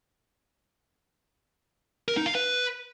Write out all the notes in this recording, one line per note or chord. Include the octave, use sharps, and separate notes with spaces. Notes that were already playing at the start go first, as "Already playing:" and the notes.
A#4
D#4
F5
B4